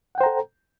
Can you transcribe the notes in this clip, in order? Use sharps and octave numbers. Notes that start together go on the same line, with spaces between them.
A4 C5 F#5 G5 A#5